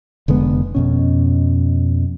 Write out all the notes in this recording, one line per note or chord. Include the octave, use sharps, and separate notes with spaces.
F1 D3 G#3 B3
F2 B2 C#4